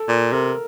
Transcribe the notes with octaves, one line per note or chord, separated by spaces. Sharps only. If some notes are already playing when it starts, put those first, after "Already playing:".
Already playing: A4
A#2
C3 A#4